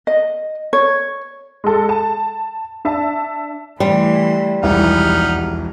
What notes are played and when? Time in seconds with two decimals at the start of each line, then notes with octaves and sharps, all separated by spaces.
0.07 D#5
0.73 C#5
1.64 G#3 A4
1.89 A5
2.85 D4 E5 A5
3.80 E3 G3 A3 C6
4.63 E1 C2 F2 E3 B3 D#4 F6